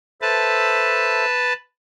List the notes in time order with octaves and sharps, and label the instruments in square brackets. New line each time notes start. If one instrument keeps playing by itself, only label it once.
[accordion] A4 C5 E5 [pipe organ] B4 A5